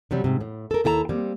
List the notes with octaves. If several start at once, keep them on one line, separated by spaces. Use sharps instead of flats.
C3 F#3 G3
G#2 C3
A2
A4 A#4
D#2 E4 A4 G5 A#5
G3 A#3 C4